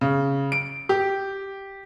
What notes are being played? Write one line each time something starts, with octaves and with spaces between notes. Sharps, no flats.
C#3
D7
G4